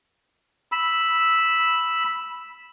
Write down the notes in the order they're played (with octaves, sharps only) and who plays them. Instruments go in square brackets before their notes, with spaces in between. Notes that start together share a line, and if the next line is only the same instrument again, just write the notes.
[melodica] B5 E6